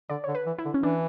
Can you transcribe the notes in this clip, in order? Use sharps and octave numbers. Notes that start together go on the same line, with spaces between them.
D3 D5
D3 C#5
B4
E3
E4
D3
C#4
E3 D4